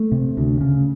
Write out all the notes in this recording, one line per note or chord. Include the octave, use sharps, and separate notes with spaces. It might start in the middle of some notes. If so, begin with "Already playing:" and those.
Already playing: A3
C3
D2
C#3